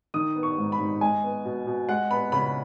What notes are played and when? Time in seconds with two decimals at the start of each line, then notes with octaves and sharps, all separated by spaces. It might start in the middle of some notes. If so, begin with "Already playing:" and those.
0.14 D#3 D#6
0.36 B3
0.43 C#6
0.58 G#2
0.72 B5
0.79 G#2
1.01 G#3 G#5
1.23 B3
1.45 B2
1.67 B2
1.89 G#3 F#5
2.11 B3 B5
2.32 C#3 B5